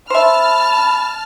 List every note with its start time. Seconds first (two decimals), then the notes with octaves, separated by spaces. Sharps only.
0.10 C5 E5 A5 B5 F6